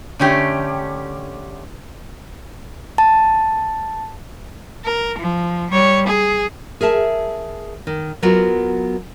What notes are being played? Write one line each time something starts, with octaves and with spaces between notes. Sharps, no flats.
D3 A3 C#4 G4
A5
A#4
F3
G3 C#5
G#4
G#4 A#4 E5 A5
D#3
F#3 B3 F4 F#4 A#4